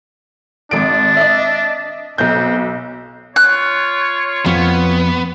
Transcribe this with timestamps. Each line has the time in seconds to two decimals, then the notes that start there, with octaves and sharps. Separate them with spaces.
0.71 G#1 D4 D7
1.17 D#5 E5
2.18 B1 C4 G6
3.36 F4 C#5 F#6
4.46 F2 B3